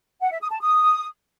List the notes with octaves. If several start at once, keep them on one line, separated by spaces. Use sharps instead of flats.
F#5
E5
D#6
A5
D#6